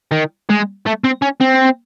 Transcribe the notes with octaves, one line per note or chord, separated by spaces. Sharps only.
D#3
G#3
A3
C4
C#4
C4